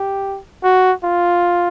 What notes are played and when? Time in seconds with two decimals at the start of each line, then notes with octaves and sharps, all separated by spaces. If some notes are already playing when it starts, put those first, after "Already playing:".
Already playing: G4
0.63 F#4
1.04 F4